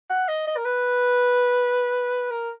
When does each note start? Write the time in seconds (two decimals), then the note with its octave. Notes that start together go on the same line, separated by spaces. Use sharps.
0.10 F#5
0.28 D#5
0.47 D#5
0.57 A#4
0.65 B4
2.31 A#4